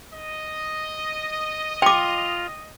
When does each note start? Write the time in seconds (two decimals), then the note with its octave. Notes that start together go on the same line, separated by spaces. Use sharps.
0.13 D#5
1.82 F4 G5 D6